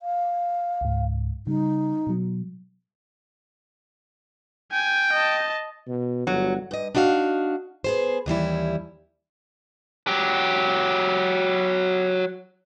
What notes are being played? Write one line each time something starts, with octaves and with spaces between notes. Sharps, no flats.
F5
C#2 G#2
C#3 G3 D#4
B2 F#3
G5 G#5
D#5 A5
B2
G1 F#3
G2 D#5
D4 D#4 F#4 D#5 F5
B3 G#4 C5
D#2 E3 G3 E4
F#3 G4